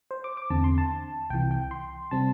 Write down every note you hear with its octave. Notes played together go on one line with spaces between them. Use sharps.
C5
D6
D6
E2 D3 C4 A5
C6
A5
C2 C3 E3 G5
G5
C6
C3 G3 C4 A5